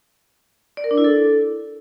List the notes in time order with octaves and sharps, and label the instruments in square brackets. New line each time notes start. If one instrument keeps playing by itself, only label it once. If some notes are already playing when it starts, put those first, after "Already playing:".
[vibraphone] D5
A#4
D4
E4
A4